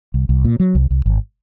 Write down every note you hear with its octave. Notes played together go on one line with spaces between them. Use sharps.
C2
C2
A#2
F#3
C2
C2
G#1